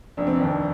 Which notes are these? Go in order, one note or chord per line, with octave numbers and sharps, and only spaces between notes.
F1 D4
C4
D#2 D4